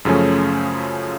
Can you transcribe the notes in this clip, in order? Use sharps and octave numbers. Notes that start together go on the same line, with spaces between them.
F#2 C#3 F3 A3 C#4